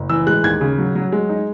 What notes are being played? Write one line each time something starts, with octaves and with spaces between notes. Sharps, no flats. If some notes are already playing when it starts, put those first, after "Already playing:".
Already playing: F#1
E3 E6
G#3 F#6
D#2 G#6
C#3
F#3
F#3
G#3
D#4